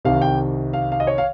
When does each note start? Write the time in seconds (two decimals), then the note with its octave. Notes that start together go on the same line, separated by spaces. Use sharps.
0.05 C2 C3 D#3 F5
0.22 G5
0.73 F5
0.92 F5
1.00 D#5
1.07 C#5
1.18 F5